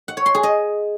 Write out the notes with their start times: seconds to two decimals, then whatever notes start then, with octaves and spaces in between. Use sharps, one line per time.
0.08 F#5
0.17 C#5
0.26 C6
0.35 G#4
0.43 D#5